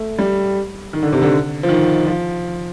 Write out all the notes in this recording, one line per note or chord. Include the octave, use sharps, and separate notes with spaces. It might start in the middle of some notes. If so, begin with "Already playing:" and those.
Already playing: A3
G3
D#3
D3
C3
D3
F3
D#3
F3